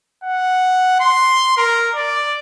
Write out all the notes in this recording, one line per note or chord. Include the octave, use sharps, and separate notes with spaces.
F#5
C6
A#4
D5